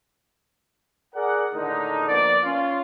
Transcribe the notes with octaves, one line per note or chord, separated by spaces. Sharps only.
G#4 A#4 D5 F#5
A2 D3 D#3 G#3 D#4
F3 A#3 B3 D5
C#4 F4